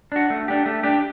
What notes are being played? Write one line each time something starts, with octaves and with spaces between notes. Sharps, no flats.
D4 F#4
A3
D4 G4
A3
D4 G4